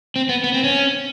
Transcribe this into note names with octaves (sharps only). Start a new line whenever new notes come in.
C4
B3
B3
C4
C#4